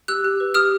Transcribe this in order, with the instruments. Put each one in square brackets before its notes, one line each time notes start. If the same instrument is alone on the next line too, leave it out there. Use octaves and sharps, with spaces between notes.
[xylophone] G4 E6 F#6
G4
B4
G4 D#6 F6